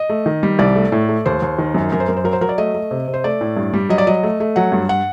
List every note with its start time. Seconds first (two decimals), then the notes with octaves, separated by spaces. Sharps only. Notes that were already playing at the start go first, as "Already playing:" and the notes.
Already playing: D#5
0.09 A3
0.26 D#3
0.43 G3
0.59 C2 D5
0.76 A3
0.92 A2
1.09 A3
1.26 D#2 C5
1.42 D#2
1.59 D#3
1.74 F#2
1.92 F#2 A#4
2.00 C5
2.08 F#2 A#4
2.17 C5
2.24 F#3 A#4
2.33 C5
2.41 F#3 A#4
2.49 D5
2.58 A3 D#5
2.74 A3
2.91 C3
3.08 C3
3.14 C5
3.24 A3 D5
3.41 A2
3.57 G2
3.73 G3
3.89 F#3 D#5
3.98 D5
4.07 F#3 D#5
4.23 A3
4.40 A3
4.56 F#3 F#5
4.72 G2
4.89 F#5